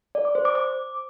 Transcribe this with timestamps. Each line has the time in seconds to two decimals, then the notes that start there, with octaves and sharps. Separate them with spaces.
0.15 D5
0.25 D6
0.35 C5
0.45 D6
0.55 D6